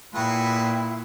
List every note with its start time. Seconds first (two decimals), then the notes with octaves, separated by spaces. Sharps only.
0.15 A#2 E4 F#4 G#4 B4 G5